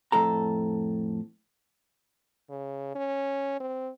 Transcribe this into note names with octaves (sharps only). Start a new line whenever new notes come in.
F2 A2 A4 A#5
C#3
C#4
C4